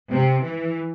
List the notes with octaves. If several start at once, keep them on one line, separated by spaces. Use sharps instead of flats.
C3
E3